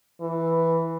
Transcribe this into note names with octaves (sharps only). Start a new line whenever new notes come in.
E3